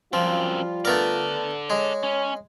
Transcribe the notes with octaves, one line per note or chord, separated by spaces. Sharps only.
F#2 F3 G3 C4 F4
A3 B3 A4 A#4 D5
G#3 C#5
C#4